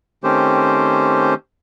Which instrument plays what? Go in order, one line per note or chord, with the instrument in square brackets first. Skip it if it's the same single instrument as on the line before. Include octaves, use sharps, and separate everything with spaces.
[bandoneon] D#3 A3 C4 C#4 G4 C5